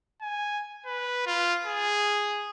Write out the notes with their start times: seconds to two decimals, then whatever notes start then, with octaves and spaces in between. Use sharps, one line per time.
0.21 G#5
0.86 B4
1.26 F4
1.66 G#4